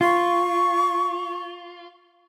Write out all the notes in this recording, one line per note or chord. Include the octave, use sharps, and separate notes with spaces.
F4 C#6